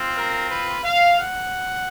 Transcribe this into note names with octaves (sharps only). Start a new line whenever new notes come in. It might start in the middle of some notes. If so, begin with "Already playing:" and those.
Already playing: C4 F4
A#4
B4
F5
F#5